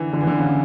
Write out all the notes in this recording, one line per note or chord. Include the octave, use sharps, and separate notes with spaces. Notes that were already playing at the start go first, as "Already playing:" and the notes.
Already playing: D3 E3
D3
E3
D3
C#3